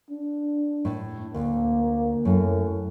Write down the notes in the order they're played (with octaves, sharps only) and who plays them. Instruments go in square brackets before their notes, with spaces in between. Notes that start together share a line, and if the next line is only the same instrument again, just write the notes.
[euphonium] D4
[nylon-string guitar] A2
[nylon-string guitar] D2 [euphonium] A#3
[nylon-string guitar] F#2 [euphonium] A2